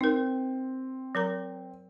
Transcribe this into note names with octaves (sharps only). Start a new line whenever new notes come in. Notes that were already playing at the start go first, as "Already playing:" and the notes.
C4 D#4 A#4
F#3 A#4 A#5